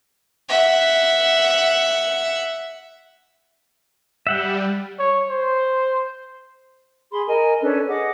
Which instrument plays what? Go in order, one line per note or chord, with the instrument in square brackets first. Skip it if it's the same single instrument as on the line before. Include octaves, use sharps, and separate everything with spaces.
[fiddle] E5 F#5
[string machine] G3 [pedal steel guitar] E5 F#5 G5
[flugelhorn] C#5
C5
[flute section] G#4 B5 C6
A#4 D#5 G#5
C#4 D4 A4 B4
G#4 D#5 F#5 D6